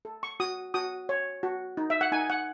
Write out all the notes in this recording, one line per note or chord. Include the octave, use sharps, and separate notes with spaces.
A4
C#6
F#4 D#6
F#4 D#6
C#5
F#4
D#4
E5
F#5
D#4 G#5
F#5